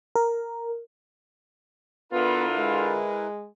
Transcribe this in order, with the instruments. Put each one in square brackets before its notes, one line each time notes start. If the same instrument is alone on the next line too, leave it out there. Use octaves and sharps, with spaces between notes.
[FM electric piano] A#4
[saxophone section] D3 F4 [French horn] B3 [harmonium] E4 A#4 B4
[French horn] G#3